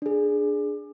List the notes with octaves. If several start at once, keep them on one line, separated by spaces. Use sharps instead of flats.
D4 G#4